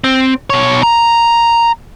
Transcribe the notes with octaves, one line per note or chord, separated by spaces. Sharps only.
C4
B2 C#5
A#5